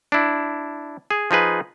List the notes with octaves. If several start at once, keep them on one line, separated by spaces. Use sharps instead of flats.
D4 E4
G#4
F3 D#4 G#4 B4